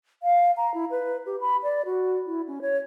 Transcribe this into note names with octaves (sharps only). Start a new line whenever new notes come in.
F5
A#5
E4
B4
G4
B5
D5
F#4
E4
C#4
C#5